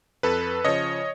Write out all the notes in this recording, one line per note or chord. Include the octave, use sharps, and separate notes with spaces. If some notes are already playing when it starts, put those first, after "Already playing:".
F2 A4 B4
C#3 F3 C#5 D#5